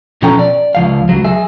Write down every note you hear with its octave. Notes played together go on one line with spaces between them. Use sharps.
B2 F3 C#4 A4 G5 A#5
D5
C#2 F3 F5
C#2 F#3
G#4 E5